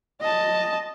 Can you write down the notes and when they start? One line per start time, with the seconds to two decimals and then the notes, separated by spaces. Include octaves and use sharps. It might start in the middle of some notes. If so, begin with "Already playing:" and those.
0.21 D#5 A5